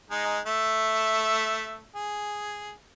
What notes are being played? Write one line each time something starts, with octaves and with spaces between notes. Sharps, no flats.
G#3 D#4
A3 E5
G#4